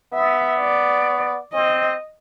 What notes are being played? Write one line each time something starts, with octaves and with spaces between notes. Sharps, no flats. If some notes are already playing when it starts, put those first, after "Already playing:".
B3 E5
D5
C4 D#5